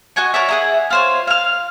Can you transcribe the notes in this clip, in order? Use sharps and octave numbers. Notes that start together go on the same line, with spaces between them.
F#4 D#5 G#5 C#6
A#4 C#5 D5 E5
E4 G#4 F#5
F4 C5 C#5
F5 F6